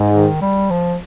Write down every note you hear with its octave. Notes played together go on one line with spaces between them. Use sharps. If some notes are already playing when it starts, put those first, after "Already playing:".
Already playing: G#2
D#3
G3
F3